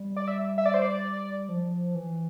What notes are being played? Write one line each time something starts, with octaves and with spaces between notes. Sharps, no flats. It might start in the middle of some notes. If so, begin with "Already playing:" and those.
Already playing: G3
D5
E5
E5
D5
C5
D5
F3
E3